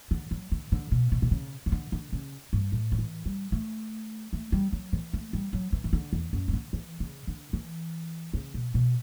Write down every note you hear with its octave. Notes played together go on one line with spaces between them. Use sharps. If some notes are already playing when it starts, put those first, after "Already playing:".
D3
F#3
D3
D3
B2
B2
B2
C#3
C#3
D3
D3
C#3
G2
A2
F#3
E3
G3
A3
A3
G3
F#3
E3
A3
G3
F#3
E3
E3
D3
E2
F#2
E3
D3
E3
C#3
D3
E3
C#3
B2
B2